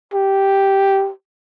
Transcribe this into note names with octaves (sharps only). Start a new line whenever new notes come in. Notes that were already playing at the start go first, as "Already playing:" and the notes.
G4